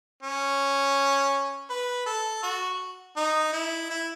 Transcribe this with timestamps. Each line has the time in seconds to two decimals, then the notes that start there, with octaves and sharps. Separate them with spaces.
0.23 C#4
1.70 B4
2.06 A4
2.43 F#4
3.17 D#4
3.53 E4
3.90 E4